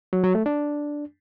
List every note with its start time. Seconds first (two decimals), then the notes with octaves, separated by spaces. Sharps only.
0.13 F#3
0.24 F#3
0.35 A3
0.46 D4